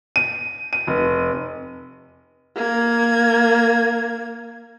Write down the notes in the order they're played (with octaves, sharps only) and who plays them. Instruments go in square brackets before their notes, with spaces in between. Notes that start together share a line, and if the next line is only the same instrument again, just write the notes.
[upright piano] D#7
D#7
F1
[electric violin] A#3 G#6